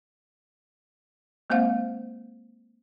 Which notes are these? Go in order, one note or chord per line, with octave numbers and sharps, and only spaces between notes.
G#3 A#3 C4 C5 F5 F#5